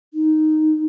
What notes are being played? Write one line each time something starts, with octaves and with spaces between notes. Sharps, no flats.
D#4